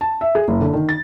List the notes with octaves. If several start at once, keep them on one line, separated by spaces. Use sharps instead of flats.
A5
E5
G#4
F#1
D3
D#3
A6